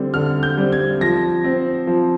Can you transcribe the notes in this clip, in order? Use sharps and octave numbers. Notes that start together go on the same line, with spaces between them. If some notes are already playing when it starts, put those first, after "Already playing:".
Already playing: D3 G3 C4
D3 F6
G6
G3 C4
G#6
F3 A#6
C4
F3